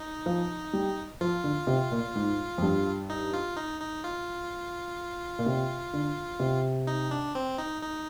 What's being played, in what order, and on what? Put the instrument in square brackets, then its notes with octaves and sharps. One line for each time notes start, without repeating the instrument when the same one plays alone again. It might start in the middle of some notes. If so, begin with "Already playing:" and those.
Already playing: [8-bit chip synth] D#4
[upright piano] F3
G3
[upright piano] F3 [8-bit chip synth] F4
[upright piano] D3
C3
A#2
G#2
F2
G2
[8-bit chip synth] D#4
F4
D#4
D#4
F4
[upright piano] A#2
C3
D3
C3
[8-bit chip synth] D#4
D4
C4
D#4
D#4